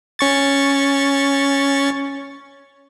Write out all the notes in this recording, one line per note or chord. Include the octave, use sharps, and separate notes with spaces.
C#4 C#6 A6